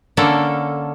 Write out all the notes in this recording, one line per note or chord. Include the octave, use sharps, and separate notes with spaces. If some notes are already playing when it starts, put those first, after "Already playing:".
D3 A#3 C#4 A4